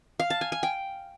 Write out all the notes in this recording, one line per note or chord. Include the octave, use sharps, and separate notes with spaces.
F5
A5
G#5
G#5
G5